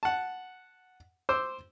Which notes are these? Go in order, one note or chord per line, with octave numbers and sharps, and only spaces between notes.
F#5 A5
C5 D6 E6